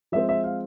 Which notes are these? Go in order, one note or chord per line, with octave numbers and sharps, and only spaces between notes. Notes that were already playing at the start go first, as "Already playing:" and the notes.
F3 G#3 C4 E5
E5
F5